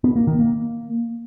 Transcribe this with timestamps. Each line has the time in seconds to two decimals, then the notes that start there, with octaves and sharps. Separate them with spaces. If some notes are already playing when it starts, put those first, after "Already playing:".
0.04 B3
0.16 A#3
0.27 D#3
0.39 A#3